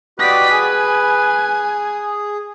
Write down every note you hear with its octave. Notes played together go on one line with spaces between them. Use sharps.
F#4 G4 B4 D5 D#5 B6
G#4 G#5